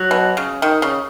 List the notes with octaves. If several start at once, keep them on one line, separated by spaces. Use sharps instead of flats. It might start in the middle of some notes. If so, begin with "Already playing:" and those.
Already playing: F#3
B2
C#3
D#3
C#3